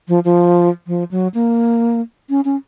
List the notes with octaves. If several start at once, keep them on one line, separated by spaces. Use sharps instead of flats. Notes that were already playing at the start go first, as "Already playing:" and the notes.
F3
F3
F3
F#3
A#3
C#4
C#4